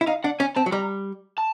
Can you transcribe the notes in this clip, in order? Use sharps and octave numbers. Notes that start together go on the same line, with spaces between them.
E4
D#4 F5
D4 F#5
C#4 G#5
C4 A5
F#3
G3 A#5
A5